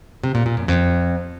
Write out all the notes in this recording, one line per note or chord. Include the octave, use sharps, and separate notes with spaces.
C3
A#2
A#2
F#2
F2